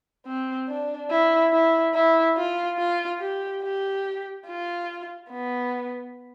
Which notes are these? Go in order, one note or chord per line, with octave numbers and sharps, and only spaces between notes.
C4
D4
E4
E4
E4
F4
F4
G4
G4
F4
B3